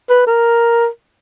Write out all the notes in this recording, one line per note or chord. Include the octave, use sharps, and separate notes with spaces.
B4
A#4